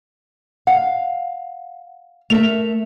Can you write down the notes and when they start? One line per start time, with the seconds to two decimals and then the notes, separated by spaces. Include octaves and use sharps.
0.67 F5 F#5
2.30 A3 A#4 E5 F7